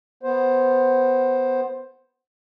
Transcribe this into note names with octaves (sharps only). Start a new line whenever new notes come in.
B3 C5